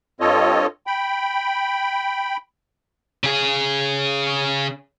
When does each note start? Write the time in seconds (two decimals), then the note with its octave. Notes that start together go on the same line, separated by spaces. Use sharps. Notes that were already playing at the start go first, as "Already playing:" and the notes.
0.20 G2 C4 F4 A4 C#5 D#5
0.87 G5 B5
3.24 C#3 G#4